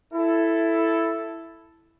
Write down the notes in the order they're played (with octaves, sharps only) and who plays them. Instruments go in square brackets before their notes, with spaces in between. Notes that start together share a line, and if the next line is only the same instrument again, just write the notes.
[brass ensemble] E4 A4